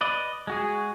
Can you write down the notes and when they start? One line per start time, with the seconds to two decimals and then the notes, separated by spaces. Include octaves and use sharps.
0.01 B4 D5 D#5
0.47 G#3 F#4 G#4